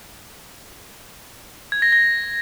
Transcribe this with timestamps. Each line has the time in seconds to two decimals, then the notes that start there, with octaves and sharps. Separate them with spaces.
1.72 G#6
1.82 A#6
1.92 A#6